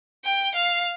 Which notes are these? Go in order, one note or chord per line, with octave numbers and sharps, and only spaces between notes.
G5
F5